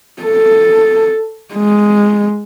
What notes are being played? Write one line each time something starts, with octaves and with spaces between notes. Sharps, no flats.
A4
G#3